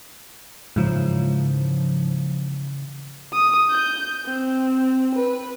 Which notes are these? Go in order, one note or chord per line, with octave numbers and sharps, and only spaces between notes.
G#2 C#3 E3 F3 A#3
D#6
G6
C4
B4